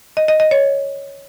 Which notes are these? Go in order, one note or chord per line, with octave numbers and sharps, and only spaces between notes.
D#5
D#5
D#5
C#5